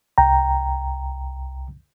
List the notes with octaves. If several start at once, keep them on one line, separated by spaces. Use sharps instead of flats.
C2 G5 A#5